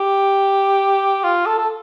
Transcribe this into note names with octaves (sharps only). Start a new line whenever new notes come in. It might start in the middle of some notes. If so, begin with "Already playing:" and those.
Already playing: G4
F4
A4
A4